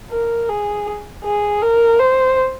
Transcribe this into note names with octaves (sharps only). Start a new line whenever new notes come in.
A#4
G#4
G#4
A#4
C5